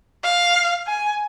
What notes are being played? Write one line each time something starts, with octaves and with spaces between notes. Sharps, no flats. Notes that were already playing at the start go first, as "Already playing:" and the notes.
F5
G#5